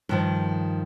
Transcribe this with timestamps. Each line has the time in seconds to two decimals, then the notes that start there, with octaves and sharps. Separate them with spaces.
0.09 G2 D#3 F3